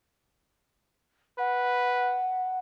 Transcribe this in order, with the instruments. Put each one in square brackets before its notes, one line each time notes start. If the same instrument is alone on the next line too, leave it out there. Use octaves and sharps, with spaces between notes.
[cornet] B4 [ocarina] F#5